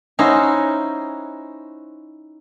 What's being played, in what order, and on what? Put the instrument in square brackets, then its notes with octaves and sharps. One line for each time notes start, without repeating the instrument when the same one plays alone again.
[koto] C#4 D#4 E4 F#4 C5